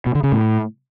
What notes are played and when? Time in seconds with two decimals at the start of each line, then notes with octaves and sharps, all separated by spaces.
0.06 B2
0.15 D3
0.24 C#3
0.32 A2